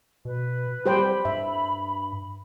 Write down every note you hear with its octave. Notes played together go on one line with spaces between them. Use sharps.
B2 B4
G3 G4 C5 G5 B5
G2 E5